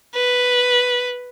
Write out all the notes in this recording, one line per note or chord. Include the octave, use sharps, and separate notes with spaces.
B4